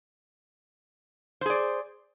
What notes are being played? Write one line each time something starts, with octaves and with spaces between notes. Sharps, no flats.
G#4 C5 D5